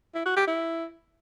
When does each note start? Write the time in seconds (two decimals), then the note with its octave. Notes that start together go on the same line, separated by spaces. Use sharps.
0.15 E4
0.25 F#4
0.36 G4
0.47 E4